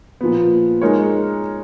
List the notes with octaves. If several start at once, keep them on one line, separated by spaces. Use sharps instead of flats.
A#2 F3 B3
G#3 D#4 A#4 C#5